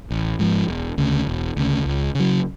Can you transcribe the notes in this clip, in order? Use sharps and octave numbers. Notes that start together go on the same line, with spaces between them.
A1
G#2 F3
E1
D2 C#3
E1
D2 C#3
C#2
C#3 F#3